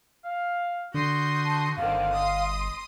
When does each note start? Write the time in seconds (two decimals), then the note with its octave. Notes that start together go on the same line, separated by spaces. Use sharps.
0.25 F5
0.94 D3 F#4 C6 D#6 G6
1.45 A5
1.77 G1 D3 D#3 C4 F5
2.13 D#5 C6 D#6